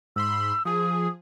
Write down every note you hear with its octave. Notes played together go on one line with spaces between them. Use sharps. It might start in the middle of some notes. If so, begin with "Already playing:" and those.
G#2 B5 C6 E6
F3 G#4 D#6